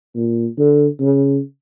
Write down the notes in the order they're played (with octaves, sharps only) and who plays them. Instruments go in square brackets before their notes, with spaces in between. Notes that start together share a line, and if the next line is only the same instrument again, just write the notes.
[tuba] A#2
D3
C#3